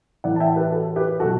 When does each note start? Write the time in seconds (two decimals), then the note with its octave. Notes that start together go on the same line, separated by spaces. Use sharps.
0.24 A2 E3 D5 F#5
0.36 A5
0.40 E5 G5
0.56 G4 B4
0.72 F#4 A4
0.96 G4 B4
1.20 B2 F#3 F#4 A4